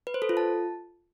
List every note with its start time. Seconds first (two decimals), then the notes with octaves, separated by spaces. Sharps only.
0.07 B4
0.14 C5
0.22 A4
0.29 F4
0.37 A5